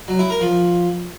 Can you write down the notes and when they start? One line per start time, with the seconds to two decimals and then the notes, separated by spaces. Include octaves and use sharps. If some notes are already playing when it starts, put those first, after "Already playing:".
0.08 F#3
0.19 E4
0.30 A#4
0.41 F3